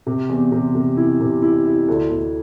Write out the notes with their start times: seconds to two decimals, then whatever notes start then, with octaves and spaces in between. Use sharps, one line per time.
0.07 C3
0.29 E2
0.52 C3
0.75 C3
0.97 E4
1.20 C3
1.42 E4
1.65 E4
1.88 D2
2.10 D2